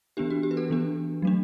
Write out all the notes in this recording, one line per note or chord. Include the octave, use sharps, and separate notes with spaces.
E3 B3 D4 G4
F#4
G4
B4
A4
E3 B3 D4
F#3 A3 D4